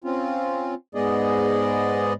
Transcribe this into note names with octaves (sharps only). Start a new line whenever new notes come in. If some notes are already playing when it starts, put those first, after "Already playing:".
C4 C#4 F4
G#2 G#3 B3 G#4 D5 D#5